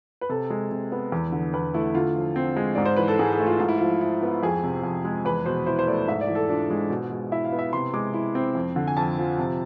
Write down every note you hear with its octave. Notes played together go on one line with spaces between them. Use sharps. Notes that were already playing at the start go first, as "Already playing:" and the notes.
B4
C3 A4
G#3
C3
B3
E2
D3
E2 B4
A3 E4
D3 F4
F3
C4
G#3
G#2 D5
C5
E3 B4
A4
G#2 G#4
G#4
A3
F4
G#2 F4
E4
F3 F4
E4
B3
F2 G#4
C3
F2
G#3
E2 B4
B2 C5
E4 C5
C5
A3 D5
G#2 E5
D5
E3
A4
D4 F4
G#3
B2
G#3
E4 E5
F5
B3
E5
C3 C6
G#3 D6
E4
C4
F2
D3
G#5
F2 A5
F3
C3